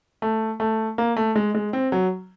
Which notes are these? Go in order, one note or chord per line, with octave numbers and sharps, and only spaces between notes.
A3
A3
A#3
A3
G#3
G#3
C4
F#3